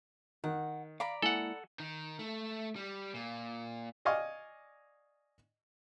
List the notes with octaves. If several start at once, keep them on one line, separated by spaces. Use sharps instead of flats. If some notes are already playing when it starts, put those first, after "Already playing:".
D#3 F#5
D5 F5 A#5 B5
G#3 A#3 E4 A4 F#5 G#5
D#3
A3
G3
A#2
D5 D#5 F5 G#5 C#6